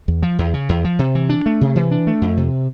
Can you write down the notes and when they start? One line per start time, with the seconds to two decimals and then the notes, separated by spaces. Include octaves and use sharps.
0.08 E2
0.23 F3
0.39 E2
0.54 C#3
0.69 E2
0.84 F3
0.99 C3
1.15 E3
1.29 D4
1.46 A3
1.61 C3
1.76 E3
1.91 D4
2.07 A3
2.21 F2
2.37 C3